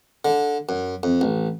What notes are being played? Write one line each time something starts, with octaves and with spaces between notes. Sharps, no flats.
D3
F#2
F2
A1